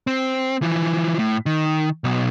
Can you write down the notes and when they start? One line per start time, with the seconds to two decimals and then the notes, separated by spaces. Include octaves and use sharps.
0.07 C4
0.62 E3 F3
1.19 A2
1.46 D#3
2.04 B1 B2